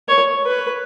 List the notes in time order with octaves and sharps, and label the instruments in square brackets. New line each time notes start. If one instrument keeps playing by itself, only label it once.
[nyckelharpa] C#5
B4